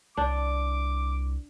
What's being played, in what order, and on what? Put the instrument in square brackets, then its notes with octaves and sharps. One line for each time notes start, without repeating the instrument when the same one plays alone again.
[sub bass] C2 [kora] D4 [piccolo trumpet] D6